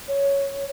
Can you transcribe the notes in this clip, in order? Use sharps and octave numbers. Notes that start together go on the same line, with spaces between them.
C#5